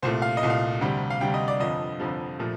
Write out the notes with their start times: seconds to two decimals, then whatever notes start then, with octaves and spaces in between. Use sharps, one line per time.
0.02 C2 A#2 A3 C5
0.22 F5
0.37 D#5
0.43 C2 A#2 A3
0.50 F5
0.81 D2 C3 G3
1.10 F5
1.21 D2 C3 G3 G5
1.34 D#5
1.48 D5
1.60 G1 F2 D3 F3 D#5
2.00 G1 F2 D3 F3
2.39 A#2 F3 A3